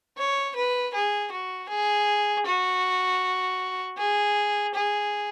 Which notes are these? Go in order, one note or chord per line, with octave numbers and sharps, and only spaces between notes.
C#5
B4
G#4
F#4
G#4
F#4
G#4
G#4